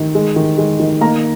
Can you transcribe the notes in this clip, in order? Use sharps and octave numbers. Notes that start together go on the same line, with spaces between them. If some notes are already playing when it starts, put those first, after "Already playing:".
Already playing: D#3
G#3
D#3
G#3
D#3
A#3 A#5